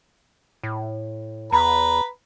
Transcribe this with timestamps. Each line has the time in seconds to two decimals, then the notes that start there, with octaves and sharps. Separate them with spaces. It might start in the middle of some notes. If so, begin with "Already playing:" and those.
0.63 A2
1.52 E2 B4 A#5 B5